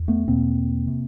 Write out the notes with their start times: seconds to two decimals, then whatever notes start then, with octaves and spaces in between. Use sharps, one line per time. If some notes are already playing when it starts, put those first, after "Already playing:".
Already playing: E2
0.08 A3 B3
0.28 E2 B2 A#3 C4
0.87 C3